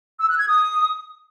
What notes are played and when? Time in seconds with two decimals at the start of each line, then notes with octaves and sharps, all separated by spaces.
0.20 E6
0.29 F#6
0.38 G#6
0.48 D#6